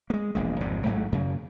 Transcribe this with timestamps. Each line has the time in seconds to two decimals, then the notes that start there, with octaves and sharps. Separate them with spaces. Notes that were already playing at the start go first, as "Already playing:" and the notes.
0.10 G#3 A#3
0.35 E1 A#1 G#3
0.61 G#1 F2 G#2 C3
0.85 A1 G#2 F#3 A3
1.12 F#2 C#3